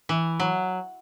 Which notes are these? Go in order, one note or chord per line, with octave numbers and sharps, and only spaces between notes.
E3
F#3